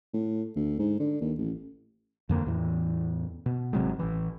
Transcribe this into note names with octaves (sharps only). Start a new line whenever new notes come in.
A2
D2
G#2
D3
D#2
A1
F2 D3 A#3
E2 A2 E3
B2
G#1 C3 F#3 G#3
A1 E3